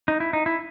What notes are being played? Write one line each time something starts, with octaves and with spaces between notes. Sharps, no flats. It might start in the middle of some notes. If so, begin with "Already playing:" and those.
D#4
E4
D#4
E4